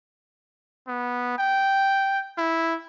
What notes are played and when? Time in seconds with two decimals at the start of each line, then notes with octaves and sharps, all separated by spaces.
0.88 B3
1.39 G5
2.38 E4